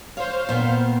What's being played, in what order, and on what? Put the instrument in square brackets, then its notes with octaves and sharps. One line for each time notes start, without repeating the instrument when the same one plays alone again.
[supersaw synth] C5 F5 [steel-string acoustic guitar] C#5
[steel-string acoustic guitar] A#2 B3 G5